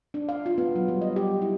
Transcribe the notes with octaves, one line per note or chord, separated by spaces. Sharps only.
D4
F5
F4
B3
F#3
G3
D#5
G4
E4